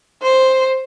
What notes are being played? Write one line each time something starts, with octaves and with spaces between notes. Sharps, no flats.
C5